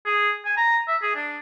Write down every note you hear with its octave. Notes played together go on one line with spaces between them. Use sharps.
G#4
G#5
A#5
E5
G#4
D4